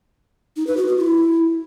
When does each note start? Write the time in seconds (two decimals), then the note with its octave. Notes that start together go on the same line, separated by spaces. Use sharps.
0.57 D#4
0.67 B4
0.77 F#4
0.88 F#4
0.98 E4